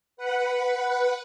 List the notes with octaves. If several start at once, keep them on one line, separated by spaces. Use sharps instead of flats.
B4 F#5